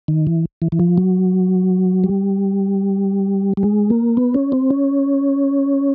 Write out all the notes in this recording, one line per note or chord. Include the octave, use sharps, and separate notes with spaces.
D#3
E3
E3
E3
F3
F#3
G3
G3
G#3
A#3
B3
C#4
C4
C#4